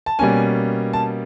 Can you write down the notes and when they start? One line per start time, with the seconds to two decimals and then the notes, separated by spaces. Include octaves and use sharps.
0.06 A5
0.19 B2 G3 A#3 C#4 G#5
0.93 A5